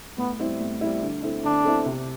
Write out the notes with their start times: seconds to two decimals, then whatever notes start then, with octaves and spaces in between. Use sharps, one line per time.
0.18 A2 B3
0.39 G3 C4 E4
0.61 A2
0.81 G3 C4 E4
1.02 D3
1.23 A3 C4 E4
1.44 D3 D4
1.65 A3 C4 E4
1.86 C3